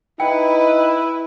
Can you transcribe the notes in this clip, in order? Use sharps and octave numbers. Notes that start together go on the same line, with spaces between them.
D#4 E4 B4 G5